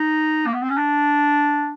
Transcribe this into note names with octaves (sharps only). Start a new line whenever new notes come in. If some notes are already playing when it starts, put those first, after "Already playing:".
Already playing: D#4
A#3
B3
C4
C#4
D4